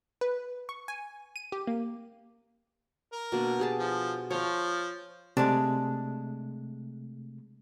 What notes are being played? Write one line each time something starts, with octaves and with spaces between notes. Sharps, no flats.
B4
C#6
G#5
D#7
G4
A#3
A#4
B2 A#3 D4
G4 G#4 A5
F3
F3 C5 C#5
C3 G#3 A3 D4